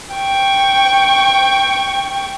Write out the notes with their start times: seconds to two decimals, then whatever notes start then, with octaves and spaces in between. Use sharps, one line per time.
0.14 G5 C#6